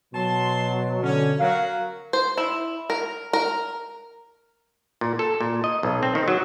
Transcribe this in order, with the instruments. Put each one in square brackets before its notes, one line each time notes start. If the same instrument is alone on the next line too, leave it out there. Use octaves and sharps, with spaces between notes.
[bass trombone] B2 [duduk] F#3 [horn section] A5 C6
[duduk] D3 [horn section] C#4
[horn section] F#3 F#4 [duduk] A#4 [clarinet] F5
[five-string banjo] C5
E4
A#4
A#4
[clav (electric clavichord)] A#2
A4
A#2
D#5
B1
C4
D#3
F#3